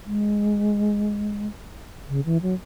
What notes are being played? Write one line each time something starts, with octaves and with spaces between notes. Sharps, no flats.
G#3
C#3
E3
F#3